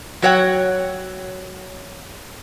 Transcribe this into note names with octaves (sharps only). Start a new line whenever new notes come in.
F#3 F#4 C#5 F#5 G5